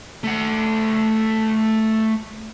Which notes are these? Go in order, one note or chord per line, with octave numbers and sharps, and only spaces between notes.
A3 F#5